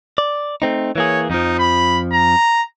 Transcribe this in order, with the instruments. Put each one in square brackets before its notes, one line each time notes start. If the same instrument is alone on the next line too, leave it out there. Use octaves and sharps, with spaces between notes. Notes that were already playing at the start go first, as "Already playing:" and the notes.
[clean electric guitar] D5
A3 C4 D#4
[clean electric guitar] E3 A#3 G#4 [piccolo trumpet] C#5
[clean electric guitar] F2 F3 [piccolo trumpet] D#4
[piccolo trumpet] B5
A#5